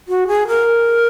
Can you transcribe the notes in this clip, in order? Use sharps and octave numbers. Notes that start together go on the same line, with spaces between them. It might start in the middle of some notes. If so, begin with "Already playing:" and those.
F#4
G#4
A#4